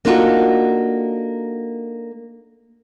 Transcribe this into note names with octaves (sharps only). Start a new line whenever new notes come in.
A#3 D4 D#4 F4 F#4 A4